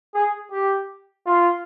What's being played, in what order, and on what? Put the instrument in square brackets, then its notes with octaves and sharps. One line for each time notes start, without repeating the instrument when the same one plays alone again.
[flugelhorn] G#4
G4
F4